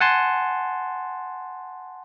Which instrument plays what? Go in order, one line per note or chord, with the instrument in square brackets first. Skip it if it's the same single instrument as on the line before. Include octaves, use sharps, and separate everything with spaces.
[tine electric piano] F#5 G#5 A5 C6